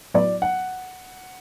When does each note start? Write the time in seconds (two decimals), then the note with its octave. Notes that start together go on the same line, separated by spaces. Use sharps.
0.14 A2 F#3 B3 E4 D5
0.42 F#5